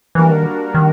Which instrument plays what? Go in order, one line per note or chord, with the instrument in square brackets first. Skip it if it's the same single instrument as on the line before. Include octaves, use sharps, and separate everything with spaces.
[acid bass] E3 [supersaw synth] G3 A#3 D4 F#4 A#4
[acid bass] D#3
D#3